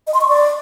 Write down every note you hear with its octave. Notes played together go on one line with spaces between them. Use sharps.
D#5
C6
C#6
D5